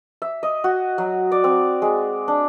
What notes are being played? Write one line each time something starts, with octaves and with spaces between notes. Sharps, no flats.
E5
D#5
F#4
F#3
D5
C4
G#3
D4